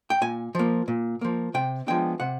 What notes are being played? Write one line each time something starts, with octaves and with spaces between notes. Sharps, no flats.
G5
A#2 G#5
F3 A#3
A#2
F3 A#3
C3 G5
F3 G#3 B3 D4 G5
C3 F#5